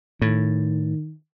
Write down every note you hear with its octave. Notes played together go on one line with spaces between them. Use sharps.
A2 D#3